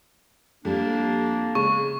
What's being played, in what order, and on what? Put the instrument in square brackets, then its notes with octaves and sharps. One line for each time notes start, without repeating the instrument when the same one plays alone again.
[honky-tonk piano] F2 G3 [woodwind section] A#3 D4
[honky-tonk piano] C#3 G#3 [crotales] C#6